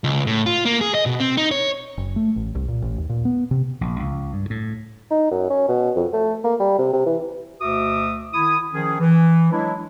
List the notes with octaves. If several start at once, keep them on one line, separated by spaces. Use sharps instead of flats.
C#2
A2
F4
A#3
G#4
D#5
B2
C4
D#4
C#5
F#1
A3
A1
C2
A#2
A1
D#2
A#2
B3
C3
A#1
C#2
G2
A2
D#4
F#2
C#4
B2
F2
A3
A#3
G3
C3
C3
E3
D2 B2 F#4 E5 D6 D#6
D#3 E4 D#6
D#3 F3 C#4 G#4
E3
F#3 G#3 D4 E4